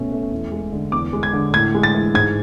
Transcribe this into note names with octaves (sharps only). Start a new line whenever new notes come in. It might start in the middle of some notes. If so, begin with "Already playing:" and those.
Already playing: B2 A3 C#4
A3
E2
G#3
D3
E2 D6
G#3
G#6
D3
A2 G#6
G#3
A6
E3
G#2 G#6